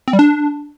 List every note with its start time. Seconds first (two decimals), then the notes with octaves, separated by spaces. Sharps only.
0.08 C4
0.13 G3
0.19 D4